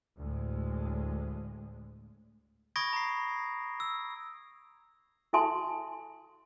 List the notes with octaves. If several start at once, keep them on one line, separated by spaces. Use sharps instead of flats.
D2 A2 G#3
B5 C#6 D#6 G#6 A#6 D7
A#5 C7
E6
E4 A4 E5 G#5 A5 C6